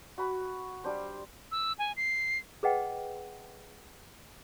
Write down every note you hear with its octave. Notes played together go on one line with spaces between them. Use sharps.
F#4 B5
G3 D4 C5
E6
G#5
C7
G#4 B4 D#5 F#5 G5